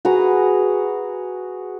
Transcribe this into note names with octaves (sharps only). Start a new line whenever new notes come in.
F#4 G#4 B4 A#5